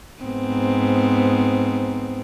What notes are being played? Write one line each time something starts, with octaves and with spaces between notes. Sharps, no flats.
G#2 B3 C4